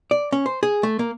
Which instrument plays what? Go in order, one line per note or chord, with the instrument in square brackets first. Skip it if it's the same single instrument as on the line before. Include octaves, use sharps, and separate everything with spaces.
[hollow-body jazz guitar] D5
C#4
C5
G#4
A3
A#3